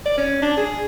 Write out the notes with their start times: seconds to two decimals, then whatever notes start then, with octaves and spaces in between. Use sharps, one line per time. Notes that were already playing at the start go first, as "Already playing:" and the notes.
0.05 D5
0.17 C#4
0.42 D4
0.57 G#4